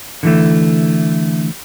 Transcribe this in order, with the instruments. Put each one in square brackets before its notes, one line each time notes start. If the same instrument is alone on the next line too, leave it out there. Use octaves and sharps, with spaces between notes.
[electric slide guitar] D3 E3 A3